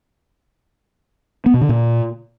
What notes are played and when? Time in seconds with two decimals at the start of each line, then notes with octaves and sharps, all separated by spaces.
1.46 B3
1.54 B2
1.61 D3
1.69 A#2